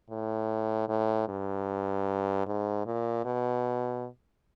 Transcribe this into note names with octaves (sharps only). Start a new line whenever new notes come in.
A2
A2
G2
G#2
A#2
B2